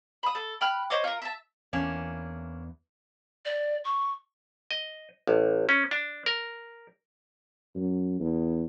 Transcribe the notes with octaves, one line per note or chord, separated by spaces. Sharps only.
B5 D#6
A4
G5 B5 F6 F#6
C5 C#5 D#5 D6
F4 A#4
E5 A5
E2 E3 A#3 C#4 D4
D5
C#6
D#5
A1
C#4
D4
A#4
F#2
E2